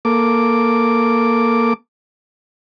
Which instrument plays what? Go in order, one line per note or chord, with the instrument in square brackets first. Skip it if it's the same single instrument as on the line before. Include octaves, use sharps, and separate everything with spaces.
[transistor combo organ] A#3 A4 D6